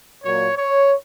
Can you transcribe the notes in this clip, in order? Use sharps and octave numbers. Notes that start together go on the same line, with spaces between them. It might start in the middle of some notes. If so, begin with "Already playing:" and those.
A#2 F#3 A#3 C#5
C#5